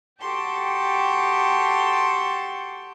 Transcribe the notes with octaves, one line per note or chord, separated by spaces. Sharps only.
F#4 G4 A4 G5 A5 C6